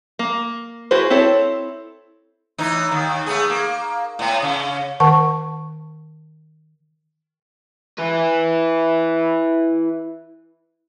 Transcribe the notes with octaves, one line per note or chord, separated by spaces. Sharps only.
A#3
E4 F#4 G#4 B4 C5
C4 E4 A4 C#5
A2 E3 D#4
D#2 D#3
A3 B3 G#4
A#3
A2 B3
C#3 C#4
D#3 A#4 F#5 A5 C#6
E4 B4